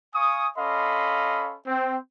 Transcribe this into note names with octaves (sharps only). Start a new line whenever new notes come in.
F5 G#5 C#6 D#6
C#4 A4 D#5 F5 B5 C6
C4